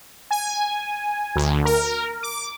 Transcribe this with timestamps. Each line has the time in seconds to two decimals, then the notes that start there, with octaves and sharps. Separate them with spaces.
0.31 G#5
1.36 D2
1.65 A#4
2.23 D6